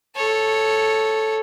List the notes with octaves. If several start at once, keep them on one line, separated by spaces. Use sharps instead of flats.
A4 C#5